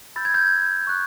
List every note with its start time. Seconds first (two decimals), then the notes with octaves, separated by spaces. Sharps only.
0.16 B5 E6 G6 A6
0.25 G#6
0.34 G6
0.87 C#6 F#6